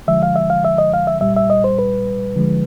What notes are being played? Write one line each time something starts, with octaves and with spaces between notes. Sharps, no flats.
D3 F3 G#3 E5
F5
E5
F5
E5
D#5
F5
E5
A#2 G3 E5
E5
D#5
C5
B4
D3 F3 G#3